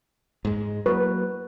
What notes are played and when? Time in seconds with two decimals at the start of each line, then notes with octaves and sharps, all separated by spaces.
0.45 G#2 G#3
0.86 F#3 A#3 B4